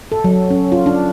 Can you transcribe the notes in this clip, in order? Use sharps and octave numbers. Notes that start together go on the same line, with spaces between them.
A4
F#3
C#4
F4
D4